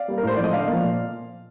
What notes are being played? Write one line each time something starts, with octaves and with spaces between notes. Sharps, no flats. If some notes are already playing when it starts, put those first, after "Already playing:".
Already playing: D5 F5
G3 A#3
A#4
A2 C5
F3 D5
A3 D#5
D3 D5 F5
F3 A#3
A#2